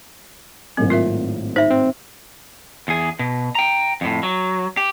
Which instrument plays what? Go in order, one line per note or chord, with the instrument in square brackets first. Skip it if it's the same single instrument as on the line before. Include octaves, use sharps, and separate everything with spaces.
[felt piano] G#1 A2 A#3 [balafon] F#3 C4
[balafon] F4 A#4 E5
[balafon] D#4 [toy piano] C5 E5
[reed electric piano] C4
[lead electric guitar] E2 G#4
B2
G5 A#5
F2 A2
F#3
G4